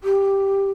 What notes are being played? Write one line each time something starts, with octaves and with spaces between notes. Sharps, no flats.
G4